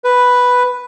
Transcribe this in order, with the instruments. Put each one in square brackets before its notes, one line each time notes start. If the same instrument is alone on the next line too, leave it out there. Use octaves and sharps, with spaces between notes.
[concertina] B4